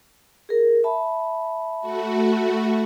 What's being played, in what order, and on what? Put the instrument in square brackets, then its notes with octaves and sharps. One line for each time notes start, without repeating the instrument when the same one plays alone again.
[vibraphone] G#4 A#4
E5 A5 B5
[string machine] A3 F#4